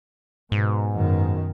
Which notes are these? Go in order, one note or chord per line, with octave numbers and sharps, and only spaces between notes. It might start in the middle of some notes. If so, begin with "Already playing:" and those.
G#2 B2
F#2 B2 D#3